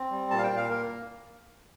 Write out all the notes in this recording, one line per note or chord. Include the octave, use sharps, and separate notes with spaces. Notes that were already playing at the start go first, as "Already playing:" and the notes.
Already playing: C4
G3
A#2 A5
F5
G5
A#2
F5
A#3 A#4